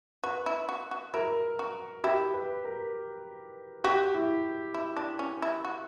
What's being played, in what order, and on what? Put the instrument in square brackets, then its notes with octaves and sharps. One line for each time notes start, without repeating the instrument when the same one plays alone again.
[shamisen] F#4 [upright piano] B4
[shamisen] E4
F#4
F#4
[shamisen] E4 [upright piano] A#4
[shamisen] F#4
[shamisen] E4 [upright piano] G4
[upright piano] B4
A#4
[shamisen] F#4 [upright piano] G4
[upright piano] E4
[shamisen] E4
D4
C#4
E4
F#4